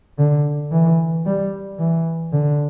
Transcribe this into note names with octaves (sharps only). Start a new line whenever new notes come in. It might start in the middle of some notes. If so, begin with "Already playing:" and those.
D3
E3
G3
E3
D3